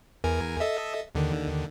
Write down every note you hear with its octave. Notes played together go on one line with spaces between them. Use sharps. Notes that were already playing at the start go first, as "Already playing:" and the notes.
E2 A#4 G#5
A4 D#5 E5
D#2 D3 D#3